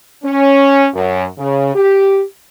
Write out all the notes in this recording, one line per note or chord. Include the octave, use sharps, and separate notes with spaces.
C#4
F#2
C#3
G4